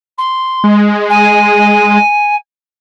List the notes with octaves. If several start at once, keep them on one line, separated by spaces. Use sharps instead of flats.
C6
G#3
G#5